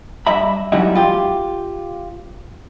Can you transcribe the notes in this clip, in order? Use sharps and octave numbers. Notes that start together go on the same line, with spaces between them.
G2 D#5 E5 B5
G#2 E3 F#3 G3 D#4 E4
F4 G4